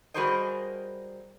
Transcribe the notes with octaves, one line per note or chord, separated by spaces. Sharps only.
G3 F#4 G#4 A#4 C5 D#5